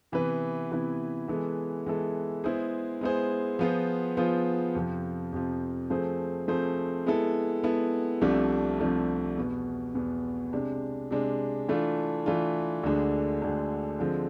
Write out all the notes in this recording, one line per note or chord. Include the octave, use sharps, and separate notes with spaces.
C3 E3 B3 E4 B4
C3 E3 B3 E4 B4
E3 G#3 B3 E4 A4
E3 G#3 B3 E4 A4
G#3 B3 E4 G#4 C5
G#3 B3 E4 G#4 C5
F3 B3 F4 G#4 C5
F3 B3 F4 G#4 C5
F2 C3 F3
F2 C3 F3
F3 A3 C4 G#4 C5
F3 A3 C4 G#4 C5
G#3 B3 E4 A4
G#3 B3 E4 A4
C2 C3 F3 A3 D4
C2 C3 F3 A3 D4
E2 B2 B3
E2 B2 B3
C3 G#3 D4
C3 G#3 D4
E3 A3 D4 F4
E3 A3 D4 F4
D2 D3 G#3 D4
D2 D3 G#3 D4
D3 F3 G#3 C4